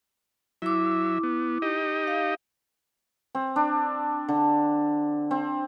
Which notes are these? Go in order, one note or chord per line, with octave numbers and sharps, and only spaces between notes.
F#3 E4 E5 D6
B3
D#4 G4 D#5
F5
C4
D4
D3
C4